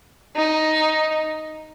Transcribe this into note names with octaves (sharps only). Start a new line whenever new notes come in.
D#4